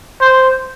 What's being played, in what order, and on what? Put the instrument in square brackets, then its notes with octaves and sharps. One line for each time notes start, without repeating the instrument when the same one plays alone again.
[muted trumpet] C5